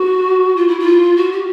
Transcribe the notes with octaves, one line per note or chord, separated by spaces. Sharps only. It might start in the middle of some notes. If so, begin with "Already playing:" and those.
Already playing: F#4
F4
E4
F4
F#4
G4